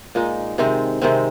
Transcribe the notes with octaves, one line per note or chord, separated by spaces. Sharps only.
A#2 G#3 D#4
C3 D#3 G#3 C4
C3 D#3 G#3 C4